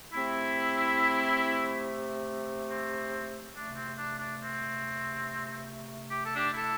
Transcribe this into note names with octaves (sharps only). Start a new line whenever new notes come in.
C3 A3 C4 E4
C4
C3 A3 D4
C4
D4
D4
C4
G4
A4
D4 G4
E4 A4